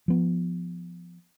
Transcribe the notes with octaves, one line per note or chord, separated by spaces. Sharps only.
F3 B3